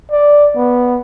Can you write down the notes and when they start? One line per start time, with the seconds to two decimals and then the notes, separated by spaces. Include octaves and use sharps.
0.11 D5
0.56 B3